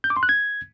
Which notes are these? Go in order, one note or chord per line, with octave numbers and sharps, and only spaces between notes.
G6
D6
C6
F#6
G#6